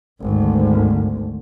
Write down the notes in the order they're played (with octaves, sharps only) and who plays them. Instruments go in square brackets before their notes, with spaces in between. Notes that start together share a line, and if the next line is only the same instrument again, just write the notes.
[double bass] G#1 D2